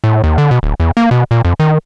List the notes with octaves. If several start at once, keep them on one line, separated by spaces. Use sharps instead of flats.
A2
D#2
D3
B2
D1
E2
A#3
B2
A#2
F2
D#3